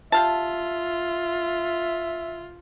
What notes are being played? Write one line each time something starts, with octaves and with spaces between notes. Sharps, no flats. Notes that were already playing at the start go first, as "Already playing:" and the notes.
F4 G4 E5 F5 A5